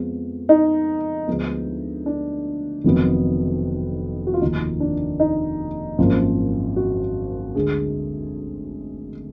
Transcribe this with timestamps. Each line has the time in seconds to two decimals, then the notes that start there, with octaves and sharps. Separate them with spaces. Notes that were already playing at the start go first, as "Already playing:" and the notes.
Already playing: F2 F3 G#3 B3
0.49 D#4
1.28 D2 D3 F3 G#3 B3
2.06 D4
2.84 F1 F2 D#3 F#3 B3
4.27 F#4
4.34 F4
4.41 F1 D#2 D#3 D#4
4.80 D4
5.20 D#4
5.98 G#1 F#2 F3 A#3
6.76 F#4
7.55 D2 D3 G#3 G#4